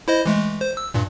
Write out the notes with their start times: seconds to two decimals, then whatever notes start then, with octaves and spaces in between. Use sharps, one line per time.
0.08 E4 C5 D#5
0.26 E3 G#3 A3
0.61 C5
0.77 E6
0.94 G2 A#2